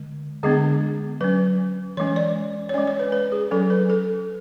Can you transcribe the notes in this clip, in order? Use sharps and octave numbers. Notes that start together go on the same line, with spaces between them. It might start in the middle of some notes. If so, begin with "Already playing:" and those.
Already playing: D3 G#3
D3 G#3 B3 D4 G#4
F#3 C#4 B4
E3 G#3 C#4 C#5
D5
C#5
G#3 C#4 D5
C#5
B4
B4
G#4
F#3 C#4 A4
B4
A4